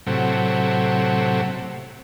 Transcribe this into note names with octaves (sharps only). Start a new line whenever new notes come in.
A2 C3 F#3